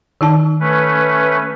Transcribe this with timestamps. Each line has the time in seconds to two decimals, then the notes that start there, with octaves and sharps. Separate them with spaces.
0.21 D#3 D#4 A5
0.60 A3 C#4 B4